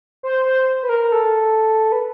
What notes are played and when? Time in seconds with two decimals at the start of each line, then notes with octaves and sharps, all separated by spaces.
0.23 C5
0.45 C5
0.83 B4
0.89 A#4
1.12 A4
1.92 B4